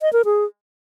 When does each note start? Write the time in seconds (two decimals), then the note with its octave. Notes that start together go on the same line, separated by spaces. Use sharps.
0.01 D#5
0.13 A#4
0.25 G#4